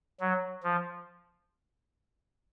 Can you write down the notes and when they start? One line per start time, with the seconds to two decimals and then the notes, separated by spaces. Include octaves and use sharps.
0.21 F#3
0.63 F3